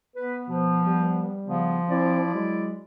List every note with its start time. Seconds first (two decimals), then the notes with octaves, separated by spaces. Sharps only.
0.16 B3 B4
0.49 B2 F3
0.86 G3
1.48 C#3 F3 B3
1.90 C4 E4 D5
2.35 F#3 G#3